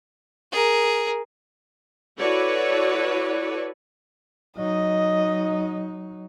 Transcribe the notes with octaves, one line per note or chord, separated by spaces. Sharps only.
G#4 A#4
E4 F#4 A4 B4 C#5 D5
F#3 D#4 D#5